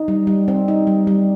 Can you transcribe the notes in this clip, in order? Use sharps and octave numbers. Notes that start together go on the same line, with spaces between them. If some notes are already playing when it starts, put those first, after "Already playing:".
Already playing: D#4
G3
G3
C4
D#4
G3
G3